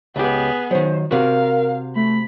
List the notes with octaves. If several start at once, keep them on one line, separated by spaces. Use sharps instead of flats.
C#2 B3 G4 G#4
D#3 F#3 C5
C3 F#4 A#4 F5
A3 B5